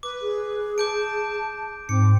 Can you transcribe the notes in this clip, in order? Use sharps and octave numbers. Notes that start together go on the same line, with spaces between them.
B4 D6
G#4
A5 D6 G6 D7
G#2 C4 D6 C#7